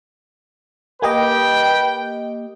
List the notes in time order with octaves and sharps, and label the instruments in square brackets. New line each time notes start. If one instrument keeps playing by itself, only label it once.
[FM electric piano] A#3 G4 D#5 [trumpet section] B4 G5